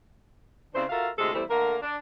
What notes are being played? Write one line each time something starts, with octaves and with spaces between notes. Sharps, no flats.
C#3 C4 D4 E4 C5
F4 F#4 A4 A#4 E5 F5
D2 A2 C3 G#3 G#4 A4
E2 G3 A3 E4 C5
D3 A3 A#3 A#4
D4